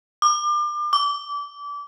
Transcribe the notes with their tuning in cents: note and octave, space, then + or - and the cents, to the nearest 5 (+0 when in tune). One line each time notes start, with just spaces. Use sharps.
D6 +35
D6 -25